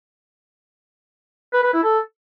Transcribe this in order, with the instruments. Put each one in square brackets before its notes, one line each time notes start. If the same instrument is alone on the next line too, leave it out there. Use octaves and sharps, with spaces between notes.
[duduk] B4
B4
E4
A4